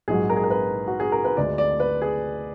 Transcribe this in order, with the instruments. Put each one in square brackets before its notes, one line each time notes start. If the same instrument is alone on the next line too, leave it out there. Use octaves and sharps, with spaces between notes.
[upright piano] A#1 G#2 F#3 G#4
A#4
G#4
A#4
B4
F#4
G#4
A#4
B4
D2 D3 G#3 D5
D5
B4
G#4